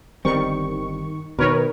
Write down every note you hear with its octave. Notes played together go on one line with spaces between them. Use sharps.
G1 D#3 G3 C4 C#6
B2 D#3 A#4 B4 C#5